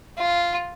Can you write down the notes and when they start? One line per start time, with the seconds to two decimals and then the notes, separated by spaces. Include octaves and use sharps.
0.18 F4